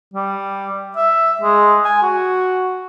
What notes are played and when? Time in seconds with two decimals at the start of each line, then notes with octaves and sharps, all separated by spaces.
0.14 G3
0.96 E5
1.41 G#3
1.85 G#5
2.02 F#4